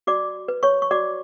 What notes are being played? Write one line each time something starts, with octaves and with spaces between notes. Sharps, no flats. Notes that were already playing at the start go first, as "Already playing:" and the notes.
F#4 D5 D6
B4
C#5 C#6
C#6
F#4 D5 D6